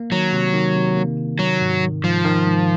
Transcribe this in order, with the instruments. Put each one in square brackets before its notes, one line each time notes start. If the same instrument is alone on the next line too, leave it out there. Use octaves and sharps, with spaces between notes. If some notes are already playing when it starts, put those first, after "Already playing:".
Already playing: [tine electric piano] A#3
[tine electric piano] D#3 [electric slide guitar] F#3
[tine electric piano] C3
D#3
C3
A#3
C3
[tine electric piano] D#3 [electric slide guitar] F#3
[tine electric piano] G#2
D#3
[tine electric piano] G#2 [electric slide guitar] F3
[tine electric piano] D#3
G#2